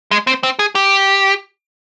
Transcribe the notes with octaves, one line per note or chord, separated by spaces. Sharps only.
G#3
C4
C4
G#4
G4